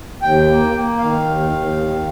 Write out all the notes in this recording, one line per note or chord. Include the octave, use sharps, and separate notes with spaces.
D#2 G5
A#3
A#3
D#3 F5
D#2
D#2
D#3